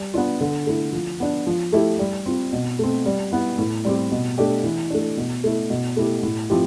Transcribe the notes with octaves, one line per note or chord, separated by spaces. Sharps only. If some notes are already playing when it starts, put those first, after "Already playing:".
Already playing: G3
B3 D4 F4
D3
A3 E4
F3
B3 D4
F3
A3 E4 G4
G3
C4 F4
B2
A3 C4
G3
B3 E4
A2
G3 C4 G4
B2
A3 D4 G4
E3
A3 D4
B2
A3 E4
B2
A3 E4 G4
A2
F3 C4 E4 G4